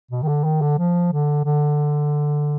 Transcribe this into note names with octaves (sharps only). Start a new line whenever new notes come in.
B2
D#3
D3
D#3
D3
F3
D3
D3